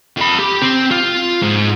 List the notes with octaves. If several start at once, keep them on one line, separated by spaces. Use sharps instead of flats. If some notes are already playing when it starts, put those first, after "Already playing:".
F2 B5
G4
C4
F4
G#2